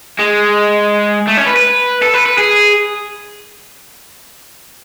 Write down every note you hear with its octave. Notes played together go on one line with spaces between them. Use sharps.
G#3
A3
C#4
B4
B4
A4
B4
B4
G#4